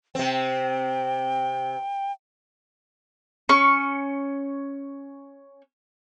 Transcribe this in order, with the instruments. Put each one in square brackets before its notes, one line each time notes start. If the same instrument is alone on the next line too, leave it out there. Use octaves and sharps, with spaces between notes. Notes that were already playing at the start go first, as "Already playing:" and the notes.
[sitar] C3 C4 [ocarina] G5
[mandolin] C#4 C#6